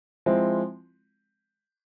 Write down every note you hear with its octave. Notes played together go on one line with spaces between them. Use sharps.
F3 G#3 C4 E4